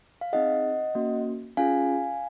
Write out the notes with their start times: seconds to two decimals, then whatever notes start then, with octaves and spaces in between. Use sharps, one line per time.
0.21 F5
0.33 C4 D#4 G#4 D#5 F#5
0.95 A#3 C#4 F#4
1.57 C#4 F4 G#4 F5 G#5